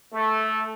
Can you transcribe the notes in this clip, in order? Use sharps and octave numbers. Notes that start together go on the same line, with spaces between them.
A3